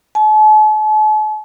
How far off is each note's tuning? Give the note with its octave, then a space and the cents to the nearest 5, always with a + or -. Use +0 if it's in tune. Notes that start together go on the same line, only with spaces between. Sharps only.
A5 -45